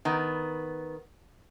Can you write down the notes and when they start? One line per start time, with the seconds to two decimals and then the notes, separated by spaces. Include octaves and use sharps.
0.05 D#3 B3